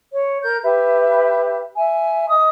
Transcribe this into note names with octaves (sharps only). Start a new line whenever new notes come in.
C#5
A#4 G6
G4 B4 E5
E5 G#5
D#5 D#6